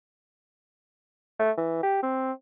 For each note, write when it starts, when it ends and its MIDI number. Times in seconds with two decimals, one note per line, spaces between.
1.40 1.51 57
1.58 1.79 52
1.83 1.98 67
2.03 2.32 60